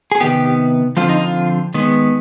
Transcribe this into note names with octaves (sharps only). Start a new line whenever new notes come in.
G#4
C3 D#3 B3 G4
D3 F3 C4 F4
D#4
F4
D#3 G#3 B3